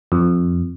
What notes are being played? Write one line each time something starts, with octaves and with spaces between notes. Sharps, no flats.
F2